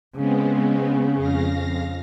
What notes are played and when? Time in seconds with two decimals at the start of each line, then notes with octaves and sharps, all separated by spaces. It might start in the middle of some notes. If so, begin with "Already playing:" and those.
0.16 C#3 G#3 B3 C4
1.16 F2 F5 A#6